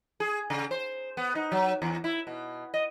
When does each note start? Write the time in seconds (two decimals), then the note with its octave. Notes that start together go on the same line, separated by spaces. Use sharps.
0.20 G#4
0.50 C#3
0.71 C5
1.17 B3
1.35 D#4
1.52 F#3
1.82 E2
2.04 E4
2.27 B2
2.74 D#5